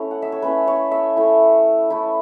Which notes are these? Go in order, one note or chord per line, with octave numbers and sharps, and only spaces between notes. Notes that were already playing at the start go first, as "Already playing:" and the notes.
Already playing: A3 C#4 E4 C#5
F#5
E5
C#5
A3 C#4 E4 B4
C#5
E5
A3 E4
A3 E4